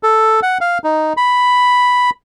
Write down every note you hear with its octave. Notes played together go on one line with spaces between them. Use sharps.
A4
F#5
F5
D#4
B5